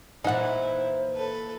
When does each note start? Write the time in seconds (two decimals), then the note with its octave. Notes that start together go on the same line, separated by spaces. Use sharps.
0.24 A#2 E3 D#4 E4 C5 F#5
1.14 A4 B4